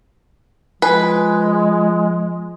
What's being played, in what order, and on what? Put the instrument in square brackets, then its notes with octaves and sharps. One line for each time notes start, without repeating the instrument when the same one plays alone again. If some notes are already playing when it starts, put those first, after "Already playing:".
[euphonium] F3 [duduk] G#3 [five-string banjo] B4 [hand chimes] G#5